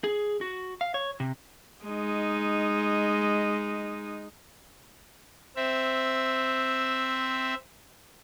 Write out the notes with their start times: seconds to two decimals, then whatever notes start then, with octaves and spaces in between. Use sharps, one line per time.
0.04 G#4
0.41 F#4
0.81 F5
0.94 C#5
1.20 C3
1.84 G#3 D#4
5.56 C4 E5